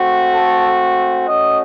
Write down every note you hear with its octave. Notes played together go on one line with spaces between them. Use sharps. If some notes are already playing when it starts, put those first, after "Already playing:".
Already playing: A3 C4 F#4
A4
A3 C#4 F#4 D#5